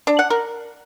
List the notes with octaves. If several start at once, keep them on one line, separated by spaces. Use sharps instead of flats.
D4
F#5
A#4